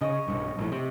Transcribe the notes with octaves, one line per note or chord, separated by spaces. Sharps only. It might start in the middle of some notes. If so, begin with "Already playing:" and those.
C#3 C#5 D#5
B1 G2
A#1 A2
C3